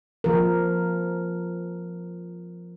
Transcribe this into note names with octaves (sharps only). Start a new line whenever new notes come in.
F3 A#4